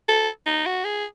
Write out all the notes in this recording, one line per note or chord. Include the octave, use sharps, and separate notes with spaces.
A4
D#4
F#4
G#4